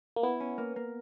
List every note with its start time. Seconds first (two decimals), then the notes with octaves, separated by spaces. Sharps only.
0.16 A#3
0.23 B3 E4
0.40 C#4
0.58 A#3
0.76 A#3